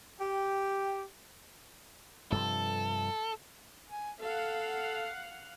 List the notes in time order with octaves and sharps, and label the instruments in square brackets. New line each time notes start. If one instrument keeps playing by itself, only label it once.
[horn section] G4 G5
[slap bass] G2 C3 F3 [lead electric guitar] A4
[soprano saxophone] G#5
[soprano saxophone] A4 [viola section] F5 F#5